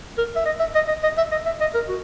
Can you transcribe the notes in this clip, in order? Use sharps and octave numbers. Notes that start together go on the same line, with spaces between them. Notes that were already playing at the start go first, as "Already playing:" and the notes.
A#4
E5
D#5
E5
D#5
D#5
D#5
E5
D#5
E5
D#5
A#4
F#4